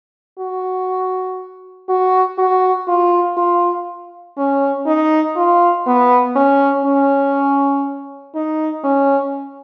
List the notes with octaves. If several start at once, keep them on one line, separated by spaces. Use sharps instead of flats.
F#4
F#4
F#4
F4
F4
C#4
D#4
F4
B3
C#4
C#4
D#4
C#4